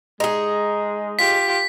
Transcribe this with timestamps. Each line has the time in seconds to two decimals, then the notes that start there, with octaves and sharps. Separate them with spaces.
0.20 G#3 D#4 G#4
1.19 F4 G4 B6